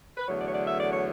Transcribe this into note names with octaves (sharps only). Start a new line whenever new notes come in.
B4
E2 D3 F#3 A3 C#5
D5
C#5
D5
E5
D5
C#5